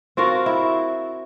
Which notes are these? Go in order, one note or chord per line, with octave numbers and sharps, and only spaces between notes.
C4 F4 F#4 A#4
E4